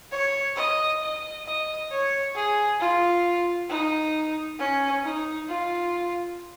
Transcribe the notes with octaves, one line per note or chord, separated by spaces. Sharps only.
C#5
D#5
D#5
D#5
C#5
G#4
F4
D#4
C#4
D#4
F4